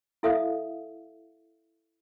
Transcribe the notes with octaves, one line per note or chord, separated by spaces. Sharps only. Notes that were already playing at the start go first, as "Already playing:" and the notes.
E4 A4 E5 F5 D#6